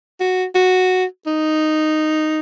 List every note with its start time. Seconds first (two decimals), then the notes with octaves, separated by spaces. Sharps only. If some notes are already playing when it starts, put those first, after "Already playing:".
0.20 F#4
0.55 F#4
1.27 D#4